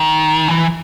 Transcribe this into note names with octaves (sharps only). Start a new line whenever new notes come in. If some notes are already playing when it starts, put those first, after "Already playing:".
Already playing: D#3
E3